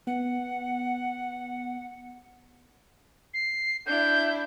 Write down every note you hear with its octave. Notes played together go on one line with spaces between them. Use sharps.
B3 F#5
C7
D4 E4 G6